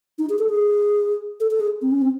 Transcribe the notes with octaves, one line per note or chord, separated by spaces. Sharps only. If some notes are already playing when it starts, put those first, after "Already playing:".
D#4
G#4
A4
G#4
A4
A4
G#4
C4
C#4
C4